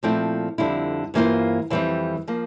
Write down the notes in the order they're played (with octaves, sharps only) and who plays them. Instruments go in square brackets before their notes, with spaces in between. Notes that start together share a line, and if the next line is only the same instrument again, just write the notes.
[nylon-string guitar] A#2 F3 A3 C4 E4
F2 D3 G3 C4 E4
G2 E3 A#3 F4 C5
F2 E3 G3 C4
F3 A#3